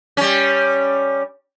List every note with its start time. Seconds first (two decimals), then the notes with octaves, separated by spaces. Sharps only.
0.17 G3 C#4